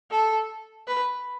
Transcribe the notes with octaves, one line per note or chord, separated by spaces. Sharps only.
A4
B4